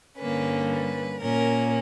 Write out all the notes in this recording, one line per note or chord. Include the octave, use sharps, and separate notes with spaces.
G2 D3 G3 A#3 C#4 B4
B4
A#2 A#3 C#4 A#4